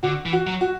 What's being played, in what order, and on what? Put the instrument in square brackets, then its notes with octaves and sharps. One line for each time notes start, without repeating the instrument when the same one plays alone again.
[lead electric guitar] D3 [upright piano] F#4
[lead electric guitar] E3
[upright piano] F#4
[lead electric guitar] F#3
[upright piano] F#4